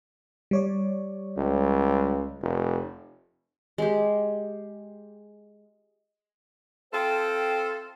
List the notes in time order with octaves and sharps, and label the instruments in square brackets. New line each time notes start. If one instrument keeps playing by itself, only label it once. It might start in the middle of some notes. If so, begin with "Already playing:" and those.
[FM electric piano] G3 C#5 D5
[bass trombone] C#2
F1
[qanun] G#3 G4
[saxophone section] C4 F4 A4 [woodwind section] C5 E5 G5